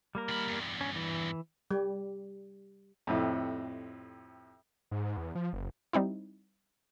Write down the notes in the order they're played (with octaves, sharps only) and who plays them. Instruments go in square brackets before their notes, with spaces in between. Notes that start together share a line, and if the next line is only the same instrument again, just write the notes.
[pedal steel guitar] G3 A#3 A#4
[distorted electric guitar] D#3 B5
E2 G2
[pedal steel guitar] C#4
E3
[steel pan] G3
[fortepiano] F2 A2 C3
[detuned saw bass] G#2
E2
F3
F#1
[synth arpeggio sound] G3 C4 D#4 E4